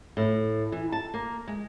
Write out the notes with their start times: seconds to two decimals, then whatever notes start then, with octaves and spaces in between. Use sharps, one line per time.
0.17 A2
0.72 E3
0.92 A5
1.14 A#3
1.48 G#3